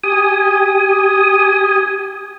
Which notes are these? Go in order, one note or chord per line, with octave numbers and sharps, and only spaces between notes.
G4 G#5 D#6